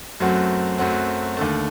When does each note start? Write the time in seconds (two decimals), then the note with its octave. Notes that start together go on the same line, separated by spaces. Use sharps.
0.20 F#2 F#3 A3 C4 F#4
0.78 F#2 F#3 A3 C4 F#4
1.37 D#2 D3 A3